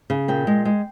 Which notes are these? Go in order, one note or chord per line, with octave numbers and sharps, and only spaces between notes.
C#3
A#2 G5
G#3
G#3